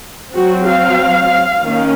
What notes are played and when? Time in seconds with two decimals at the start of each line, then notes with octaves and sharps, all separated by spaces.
0.35 F#3 C4 F#4
0.67 F5
1.63 D#3 A#3 C#4